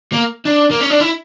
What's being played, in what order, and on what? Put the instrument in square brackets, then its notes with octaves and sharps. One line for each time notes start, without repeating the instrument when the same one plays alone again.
[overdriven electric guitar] A#3
D4
A#3
C#4
D4
E4